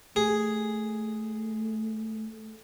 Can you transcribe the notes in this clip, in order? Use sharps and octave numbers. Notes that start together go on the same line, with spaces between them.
A3 G#4